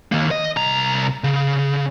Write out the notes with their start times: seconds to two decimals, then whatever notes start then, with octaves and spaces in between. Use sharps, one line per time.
0.12 D#3 A#3
0.31 D#5
0.57 C2 A#5
1.24 C#3